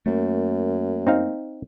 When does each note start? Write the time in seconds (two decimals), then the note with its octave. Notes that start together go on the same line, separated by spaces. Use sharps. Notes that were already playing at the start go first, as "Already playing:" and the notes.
0.06 F#2 A3 A#3
1.07 C4 D#4 F5